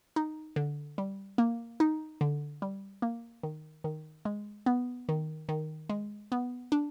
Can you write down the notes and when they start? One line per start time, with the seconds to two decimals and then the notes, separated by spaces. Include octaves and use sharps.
0.16 D#4
0.56 D3
0.98 G3
1.38 A#3
1.80 D#4
2.21 D3
2.62 G3
3.02 A#3
3.43 D#3
3.84 D#3
4.25 G#3
4.66 B3
5.09 D#3
5.49 D#3
5.89 G#3
6.32 B3
6.72 D4